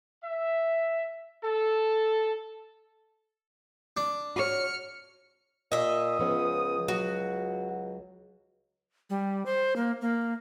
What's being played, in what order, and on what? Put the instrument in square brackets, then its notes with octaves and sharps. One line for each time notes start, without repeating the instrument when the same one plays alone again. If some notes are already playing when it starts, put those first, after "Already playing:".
[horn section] E5
A4
[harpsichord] D4
[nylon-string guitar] F#4 C#5 [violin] F6 C#7
[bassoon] A#2 [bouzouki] D#5 E5
[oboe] D#6
[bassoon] C#2 [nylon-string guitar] F3 B3 C#4
[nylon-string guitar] F#3 [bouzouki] F#4
[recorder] G3
C5
A#3
A#3